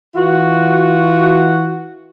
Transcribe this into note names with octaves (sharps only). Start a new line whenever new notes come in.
E3 F4 F#4